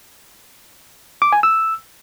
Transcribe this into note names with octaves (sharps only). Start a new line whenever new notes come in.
D6
G#5
E6